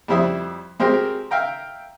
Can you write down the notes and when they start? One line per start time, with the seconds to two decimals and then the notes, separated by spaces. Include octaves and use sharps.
0.08 F2 G3 E4 C5 E5 D#6
0.80 G#3 C4 F#4 G4 A#4 C5
1.31 E5 F5 G5 A#5